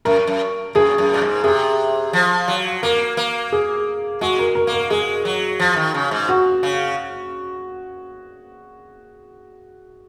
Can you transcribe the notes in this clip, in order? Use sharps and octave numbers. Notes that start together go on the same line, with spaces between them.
F#2 A#4
F#2
F#2 G#4
F#2
A#2
G#2
C3 G#4
F3
F#3
A#3 A#4
A#3
G#4
G#3 F#4
A#4
A#4
A#3
A#4
G#3 G#4
F#3
F3
D#3
C#3
G#2
F#4
C#3